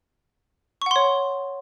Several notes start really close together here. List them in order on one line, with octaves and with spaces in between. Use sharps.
C#6 F#5 C6 C#5